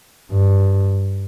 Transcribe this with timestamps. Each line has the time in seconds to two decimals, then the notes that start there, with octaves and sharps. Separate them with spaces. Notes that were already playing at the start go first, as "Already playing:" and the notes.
0.32 G2